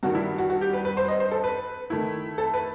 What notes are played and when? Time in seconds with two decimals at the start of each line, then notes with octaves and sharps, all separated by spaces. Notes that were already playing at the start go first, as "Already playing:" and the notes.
0.03 G2 D#3 G3 F#4
0.15 E4
0.38 F#4
0.50 F#4
0.61 G4
0.73 B4
0.85 B4
0.97 C5
1.08 D#5
1.20 C5
1.31 A4
1.44 B4
1.90 D#3 A3 E4
2.38 A4
2.54 B4